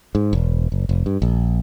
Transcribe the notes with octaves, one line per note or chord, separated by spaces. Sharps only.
G#2
E1
F#1
F1
G2
A#1